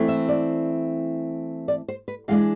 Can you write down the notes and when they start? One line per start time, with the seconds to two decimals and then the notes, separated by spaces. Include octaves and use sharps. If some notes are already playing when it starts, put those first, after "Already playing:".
Already playing: E3 A3 C4 E4
0.08 E5
0.29 D5
1.68 D5
1.88 C5
2.08 B4
2.28 E3 G#3 D4 F5